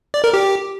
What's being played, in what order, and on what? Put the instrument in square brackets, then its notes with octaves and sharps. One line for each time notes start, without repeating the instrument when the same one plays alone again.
[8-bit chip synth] D5
A#4
G4